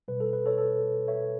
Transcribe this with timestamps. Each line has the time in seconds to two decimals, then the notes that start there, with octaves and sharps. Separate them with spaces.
0.08 B2 G3 B4
0.20 A4
0.33 B4
0.46 A4 C#5
0.58 A4
1.08 C#5 E5